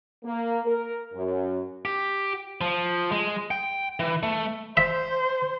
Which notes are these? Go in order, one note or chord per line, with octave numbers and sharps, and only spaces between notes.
A#3
A#4
F#2
G4
F3
G#3
G5
E3
A3
C5 E5